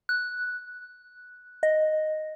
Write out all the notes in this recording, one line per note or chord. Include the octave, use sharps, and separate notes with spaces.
F#6
D#5